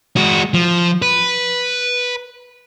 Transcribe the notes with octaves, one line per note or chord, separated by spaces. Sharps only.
G#3 F#4
F3
B4